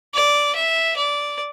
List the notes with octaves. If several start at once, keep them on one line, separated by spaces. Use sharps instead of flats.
D5
E5
D5